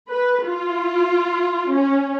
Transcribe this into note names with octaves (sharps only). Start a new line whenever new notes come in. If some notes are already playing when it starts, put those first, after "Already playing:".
B4
F4
C#4